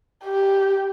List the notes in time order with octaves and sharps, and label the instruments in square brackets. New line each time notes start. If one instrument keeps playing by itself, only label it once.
[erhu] G4